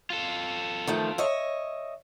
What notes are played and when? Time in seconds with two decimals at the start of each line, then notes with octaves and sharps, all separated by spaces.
0.10 F4 A4
0.87 D#3 F3 A3
1.18 C#5 D#5 E5